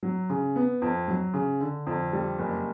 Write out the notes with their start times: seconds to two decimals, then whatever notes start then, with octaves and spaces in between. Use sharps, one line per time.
0.03 F#3
0.30 C#3
0.56 B3
0.82 F2
1.08 F#3
1.34 C#3
1.60 D3
1.86 F2
2.13 G3
2.39 F#1